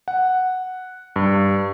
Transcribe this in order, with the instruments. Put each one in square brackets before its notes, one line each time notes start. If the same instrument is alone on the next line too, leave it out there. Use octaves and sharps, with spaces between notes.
[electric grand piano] F#5
G2